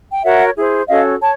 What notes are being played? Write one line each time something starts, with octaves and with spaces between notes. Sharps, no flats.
G5
F#4 A#4 C#5 E5 F#5
E4 G#4 C5
C#4 F#4 A4 C#5 D#5 F5
C#5 A5